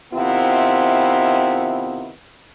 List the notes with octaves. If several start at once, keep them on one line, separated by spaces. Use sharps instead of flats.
C3 D#3 B3 C4 E4 F4